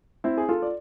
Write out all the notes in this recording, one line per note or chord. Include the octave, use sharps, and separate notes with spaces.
C4 E4
G#4
F4 A4
D5